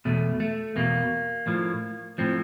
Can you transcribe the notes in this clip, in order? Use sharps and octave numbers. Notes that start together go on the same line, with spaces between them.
E2 B2 A3
A3
E2 B2 A#3
A2 F3
A2 F3 C4